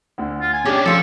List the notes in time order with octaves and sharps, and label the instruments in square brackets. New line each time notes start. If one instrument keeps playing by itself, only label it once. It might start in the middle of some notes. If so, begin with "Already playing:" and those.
[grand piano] D2 D3
[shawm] F4
G#5
[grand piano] C#3 [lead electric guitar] C#4 D4 [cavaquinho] G4 G#4 A5
[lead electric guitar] F3 [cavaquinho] F4 G#4 [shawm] A4